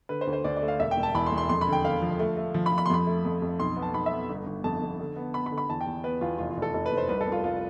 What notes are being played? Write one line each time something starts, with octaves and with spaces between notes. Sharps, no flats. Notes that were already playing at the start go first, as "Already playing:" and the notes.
D3 B4
C5
D2
C5
D2 D5
D5
A3
F5
E1 E5
G5
E1
A5
E2 B5
C6
E1
C6
F2 C6
B5
D3
G5
D3 F5
F3
A3
A3
F3
B5
F3
B5
C6
F2 B5
A3
F2
F2
B1 C6
B3
A5
B1 B5
E5
B3
G1
G1
F2 A5
F2
D3
B3
B3 B5
B5
D3
B5
E2 A5
G5
E2
B3 B4
E2 F4
F1 F4
F4
F1
A4
F1 A4
B4
F1
C5
C2 B4
A4
C2
F4
C2 F4